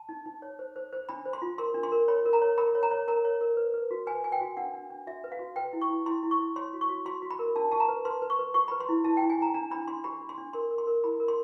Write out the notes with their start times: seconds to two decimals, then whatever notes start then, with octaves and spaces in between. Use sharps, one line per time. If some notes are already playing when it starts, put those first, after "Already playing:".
Already playing: A5
0.09 D#4
0.26 D#4
0.42 C#5
0.59 C5
0.76 C5
0.93 C5
1.09 D4 B5
1.25 C5
1.33 C6
1.42 F4
1.58 A#4 C6
1.74 D4
1.83 C6
1.92 A#4
2.08 C#5 B5
2.25 A#4
2.33 A#5
2.42 C#5
2.58 A#4 B5
2.75 C#5
2.83 A#5
2.91 C#5
3.08 A#4 A#5
3.25 C#5
3.41 A#4
3.57 B4
3.74 B4
3.91 F#4
4.07 B4 G#5
4.24 B4 G#5
4.32 G5
4.41 F#4
4.57 D4 F#5
4.73 D4
4.90 D4
5.07 F#4 E5
5.24 B4
5.32 F5
5.39 F#4
5.56 B4 G5
5.73 E4
5.81 C#6
5.89 E4
6.06 E4 C6
6.23 E4
6.31 C#6
6.39 E4
6.56 C#5 C6
6.73 F#4
6.81 C#6
6.89 F#4
7.05 F#4 C6
7.22 F#4
7.31 B5
7.39 A#4
7.56 D4 A5
7.71 G4 A5
7.80 A#5
7.89 B4
8.05 B4 C6
8.22 B4
8.30 C#6
8.39 B4
8.54 G4 C#6
8.68 B4 B5
8.80 C6
8.89 E4
9.04 E4 A5
9.17 G5
9.22 E4
9.30 G#5
9.38 E4 A#5
9.54 D4 A#5
9.71 D4 B5
9.88 D4 C6
10.04 G4 B5
10.21 D4
10.29 C6
10.38 D4
10.53 A#4 C6
10.71 A#4
10.78 C6
10.87 A#4
11.04 E4 B5
11.20 A#4
11.28 C6